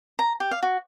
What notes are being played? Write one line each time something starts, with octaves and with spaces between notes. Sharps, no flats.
A#5
G4
F5
F#4